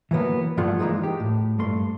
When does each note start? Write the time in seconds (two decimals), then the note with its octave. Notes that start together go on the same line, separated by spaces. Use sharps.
0.11 E3 F#3 A#3 B3
0.57 G2 F3 A3 F4 G#4 F#5
0.79 E3 G#3 A#3 D#4 F4
1.03 G4
1.20 A2
1.59 G2 A3 C6